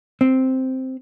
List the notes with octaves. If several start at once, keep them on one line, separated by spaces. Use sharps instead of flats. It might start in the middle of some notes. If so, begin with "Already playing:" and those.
C4